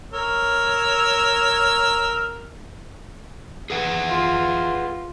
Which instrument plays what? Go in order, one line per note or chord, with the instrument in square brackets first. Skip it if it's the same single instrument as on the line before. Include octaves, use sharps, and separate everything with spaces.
[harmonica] A#4 C#5 E6
[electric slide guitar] G#4 B4 F#5
[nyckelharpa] F4